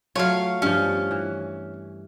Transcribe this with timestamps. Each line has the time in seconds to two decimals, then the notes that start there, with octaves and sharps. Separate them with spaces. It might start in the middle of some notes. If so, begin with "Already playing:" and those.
0.16 F#3 A3 F4 C#5 F5
0.62 G2 F3 C#4
1.11 E3